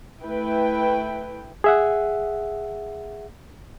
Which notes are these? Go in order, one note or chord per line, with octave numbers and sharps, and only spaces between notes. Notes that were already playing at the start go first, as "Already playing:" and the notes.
A3 E4 B4 G5
G#4 E5 F#5